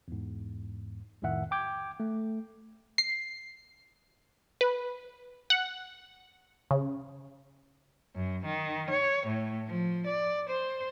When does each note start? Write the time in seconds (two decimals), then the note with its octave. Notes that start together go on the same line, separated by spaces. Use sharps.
0.08 E2 G#2
1.22 C2 F2 A2 D#3 E5 F#5
1.51 G5 D6 G6 G#6
2.00 A3
2.98 C7
4.61 B4
5.50 F#5
6.71 C#3
8.15 F#2
8.45 D#3
8.90 C#5
9.27 A2
9.67 F3
10.07 D5
10.50 C5